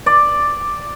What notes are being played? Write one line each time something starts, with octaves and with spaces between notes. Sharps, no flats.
D5